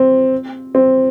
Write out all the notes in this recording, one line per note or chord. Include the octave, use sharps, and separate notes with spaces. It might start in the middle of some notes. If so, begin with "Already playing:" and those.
Already playing: C4
C4